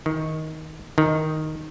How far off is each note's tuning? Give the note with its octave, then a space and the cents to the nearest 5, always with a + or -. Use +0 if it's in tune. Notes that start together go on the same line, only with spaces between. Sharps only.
D#3 +15
D#3 +0